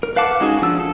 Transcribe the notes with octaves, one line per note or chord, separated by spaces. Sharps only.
A#4
B4 F5 F#5 A5 D6
G#3 C#4 D#4 F#4 G#4
F3 D4 E6
A4